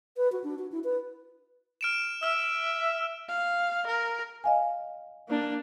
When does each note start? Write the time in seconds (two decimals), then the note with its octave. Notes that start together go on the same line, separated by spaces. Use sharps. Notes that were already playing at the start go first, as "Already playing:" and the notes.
0.17 B4
0.32 F#4
0.44 D4
0.59 F#4
0.72 E4
0.84 B4
1.81 F6 D7 E7
2.23 E5 E6 F6
3.29 F5
3.87 A#4
4.44 D#5 F5 G#5
5.29 A#3 D4